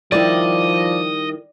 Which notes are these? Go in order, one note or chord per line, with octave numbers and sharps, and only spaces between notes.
D#3 F3 G3 E4 D5 D#5